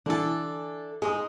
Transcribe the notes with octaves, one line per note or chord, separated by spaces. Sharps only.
D3 E3 D4 A4
G#3 D#4 G#4 D#6